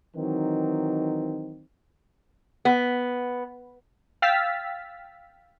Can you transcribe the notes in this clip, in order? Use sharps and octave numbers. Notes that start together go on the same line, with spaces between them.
D#3 E3 F#3 C4 D#4
B3
F5 G5 E6 F6 A6 B6